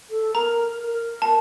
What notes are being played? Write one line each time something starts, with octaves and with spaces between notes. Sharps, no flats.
A4
A#4 A#5
A#4
A5